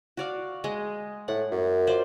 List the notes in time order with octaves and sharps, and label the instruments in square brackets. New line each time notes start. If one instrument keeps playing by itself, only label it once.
[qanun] F#4 D5 F5
G#3 D#5
[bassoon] A2 [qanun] F#5
[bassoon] F#2
[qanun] F4 C5 D5